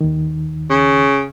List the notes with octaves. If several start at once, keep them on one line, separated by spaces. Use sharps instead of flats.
D#2 D#3
C#3